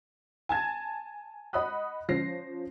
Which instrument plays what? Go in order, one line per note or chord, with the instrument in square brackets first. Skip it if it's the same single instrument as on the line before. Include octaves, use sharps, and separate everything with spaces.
[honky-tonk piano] G#5 A5 G#6 A6
D#5 F#5 B5 D#6 F#6
F3 C#4 C5 A#6 C7